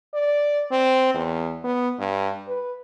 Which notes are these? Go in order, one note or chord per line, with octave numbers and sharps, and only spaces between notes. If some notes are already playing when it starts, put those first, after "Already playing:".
D5
C4
E2
B3
G2
B4